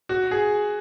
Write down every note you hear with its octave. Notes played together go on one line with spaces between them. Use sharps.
F#4
G#4